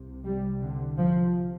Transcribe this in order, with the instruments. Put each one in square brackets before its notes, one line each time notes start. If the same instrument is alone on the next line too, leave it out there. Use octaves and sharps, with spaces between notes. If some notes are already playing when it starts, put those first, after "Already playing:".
Already playing: [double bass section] C2 C3
G3
D3
F3